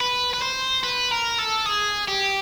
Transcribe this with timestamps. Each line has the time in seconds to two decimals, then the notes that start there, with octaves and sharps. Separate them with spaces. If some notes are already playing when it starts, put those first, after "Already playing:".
0.01 B4
0.34 B4
0.42 C5
0.84 B4
1.12 A#4
1.39 A4
1.66 G#4
2.08 G4